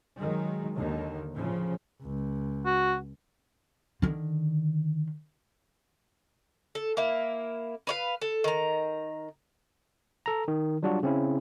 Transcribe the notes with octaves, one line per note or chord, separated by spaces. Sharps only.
D#3 F#3 G#3
D#2 D3 D#3
A2 C#3 F3
C#2
F#4
D3 D#3
A4
A#3 E4
B4 C#5 F5
A4
D#3 A#5
A4 A#5
D#3
F#3 G3 D4 F4 F#4
C#3 C4 C#4 E4